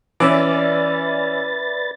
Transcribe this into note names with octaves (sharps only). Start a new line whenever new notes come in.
E3 C#4 B4 D5 E5 A6